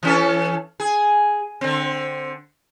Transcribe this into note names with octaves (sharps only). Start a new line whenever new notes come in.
E3 C#4 A4
G#4
D3 C4